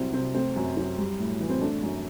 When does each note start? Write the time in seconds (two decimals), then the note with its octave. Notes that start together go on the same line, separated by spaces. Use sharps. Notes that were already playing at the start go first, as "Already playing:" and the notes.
Already playing: C2 F#3 C4
0.13 C3 C4
0.34 A3 C4
0.56 F#2
0.77 F#3
0.98 G3
1.19 A2
1.40 E3
1.49 C4
1.61 A3 D4
1.82 F#2